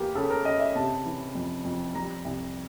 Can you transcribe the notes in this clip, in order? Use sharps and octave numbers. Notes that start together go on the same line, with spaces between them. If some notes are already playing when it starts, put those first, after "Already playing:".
Already playing: E2 A#3 G4
C#3 A4
A#4
C#3 D#5
E5
C3 A5
E3
F2
F2
G3 A#5
C2